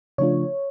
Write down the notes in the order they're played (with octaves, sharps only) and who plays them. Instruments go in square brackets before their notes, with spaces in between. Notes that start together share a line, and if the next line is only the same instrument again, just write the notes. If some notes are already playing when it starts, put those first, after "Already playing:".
[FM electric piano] C#3 F3 A3 D4 F4 C#5